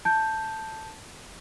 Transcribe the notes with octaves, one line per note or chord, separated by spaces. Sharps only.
A5 G6